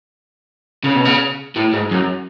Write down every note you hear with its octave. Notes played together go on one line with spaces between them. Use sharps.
C#3
B2
C#3
A2
G#2
F#2